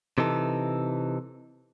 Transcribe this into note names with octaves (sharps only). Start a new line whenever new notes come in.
C3 E3 D#4 A4